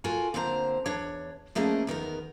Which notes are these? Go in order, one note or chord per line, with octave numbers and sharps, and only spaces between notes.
F4 F#4 A4 A#4 G#5
A#2 D3 C4 C5 C#5 A#5
E2 D4 C#5
F3 A3 A#3 C#4 G#4 D#5
E2 D#3 B3 A#4